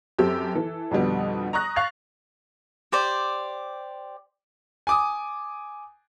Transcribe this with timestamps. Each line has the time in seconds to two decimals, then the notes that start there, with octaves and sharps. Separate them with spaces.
0.19 F#2 C4 G4 A4 E6
0.55 E3 A4
0.91 F2 B2 D3 G3 B3
1.53 A#5 C#6 D#6 F#6 A#6
1.76 F5 C#6 F#6 A6 C7 F7
2.92 G4 C5 D5
4.87 G#5 D6 D#6